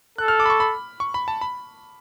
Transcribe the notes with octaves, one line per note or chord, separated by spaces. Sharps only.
A4 F#6
F6
D6
B5
C#6
B5
C#6
B5
A5
B5